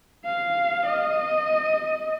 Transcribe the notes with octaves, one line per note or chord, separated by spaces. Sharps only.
F5
D#5